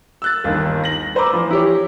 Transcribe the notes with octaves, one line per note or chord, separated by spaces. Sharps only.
E6 F#6 A6
G1 D#2 D#3
A#6 F#7
B4 C5 A#5 B5 D6 E6
E3 F3
E4 G4 C#5